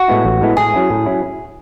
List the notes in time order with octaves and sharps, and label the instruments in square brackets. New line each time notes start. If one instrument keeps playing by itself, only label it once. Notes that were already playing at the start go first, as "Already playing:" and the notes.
Already playing: [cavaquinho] F#4
[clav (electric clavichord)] A2 G#3 B3 E4
A1
A2 G#3 B3 E4
[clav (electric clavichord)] A2 [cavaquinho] G#4
[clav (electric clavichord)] F#3 C#4 E4
A2
F#3 C#4 E4